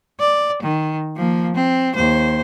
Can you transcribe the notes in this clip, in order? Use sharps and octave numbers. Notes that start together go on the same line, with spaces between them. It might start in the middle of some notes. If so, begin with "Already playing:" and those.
D5
D#3
F3 A#3
C4
D#2 C5